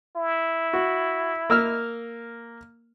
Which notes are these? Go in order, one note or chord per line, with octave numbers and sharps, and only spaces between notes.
E4
F#4
A#3 E6 F6